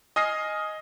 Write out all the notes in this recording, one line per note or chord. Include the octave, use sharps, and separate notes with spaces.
D#5 G#5 D#6 F6 A#6 C7